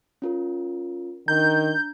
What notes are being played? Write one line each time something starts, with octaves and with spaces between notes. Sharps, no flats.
C#4 F4 A#4
D#3 D4 A#5 G6